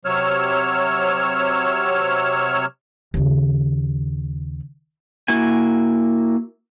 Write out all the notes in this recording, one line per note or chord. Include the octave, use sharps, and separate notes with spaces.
C3 F#3 C#5 E6 F6
D#2 C#3
A#3 E4 F#4 G#5